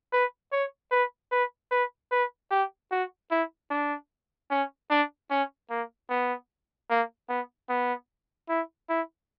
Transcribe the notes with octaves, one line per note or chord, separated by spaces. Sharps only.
B4
C#5
B4
B4
B4
B4
G4
F#4
E4
D4
C#4
D4
C#4
A#3
B3
A#3
B3
B3
E4
E4